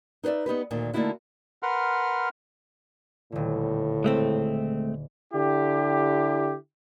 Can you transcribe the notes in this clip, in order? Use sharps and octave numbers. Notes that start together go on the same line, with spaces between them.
D#4 B4 C5 D5 E5
B3 D#4 G4 B4
D2 A#2 D#3
D3 A3 A#3 D#4 E4 F#4
A#4 B4 F#5 C6 F6
D#1 A2 D3
G#3 A3 C4
D3 E4 G4